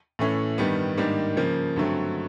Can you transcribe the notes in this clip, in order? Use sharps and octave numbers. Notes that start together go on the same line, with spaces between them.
A2 E3 A3 C#4 E4
G2 D#3 G3 B3
G#2 D#3 G3 A#3 D4
C#3 F3 A#3
G2 D3 F#3 A3 C4